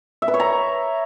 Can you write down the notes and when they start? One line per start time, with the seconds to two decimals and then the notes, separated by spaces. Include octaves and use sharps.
0.22 E5
0.28 B4
0.34 C#5
0.40 A#5